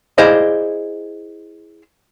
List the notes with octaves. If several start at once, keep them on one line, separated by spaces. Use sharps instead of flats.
E4 G#4 C5 D5 D#5 F5